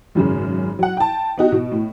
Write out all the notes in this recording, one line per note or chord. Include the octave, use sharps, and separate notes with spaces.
G#1 F#2 C#3
F#3 F#5
G5 A5
B3 D#4 F#4 G4
B2
A2